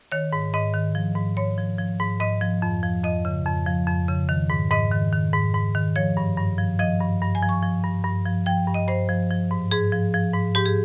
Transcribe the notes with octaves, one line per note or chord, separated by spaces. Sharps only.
D#3 C#5
G#2
G#2 D#5
D#3
F3
G#2
G#2 C#5
F3
F3
G#2
G#2 D#5
F3
F2
F3
F2 D#5
C#3
F2
F3
F2
C#3
D#3
G#2
G#2 D#5
D#3
D#3
G#2
G#2
D#3
F3 C#5
G2
G2
F3
F3 D#5
G2
G2
G#5
F3
C#6
F3
G2
G2
F3
F3 G5
G2
D#5
G2 C5
F3
F3
G#2
G#2 G#4
F3
F3
G#2
G#2 G4
G#4